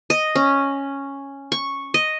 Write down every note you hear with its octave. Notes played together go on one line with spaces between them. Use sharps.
D#5
C#4
C#6
D#5